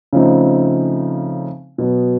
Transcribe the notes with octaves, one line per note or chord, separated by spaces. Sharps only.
C#3 F3 A3 C4 D#4
B2 F#3 B3